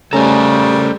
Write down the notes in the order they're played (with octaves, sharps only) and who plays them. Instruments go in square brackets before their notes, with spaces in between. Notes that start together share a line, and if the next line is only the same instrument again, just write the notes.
[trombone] C#3 [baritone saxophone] G3 [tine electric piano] A3 C#4 A#5 [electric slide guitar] A4 A#4 C5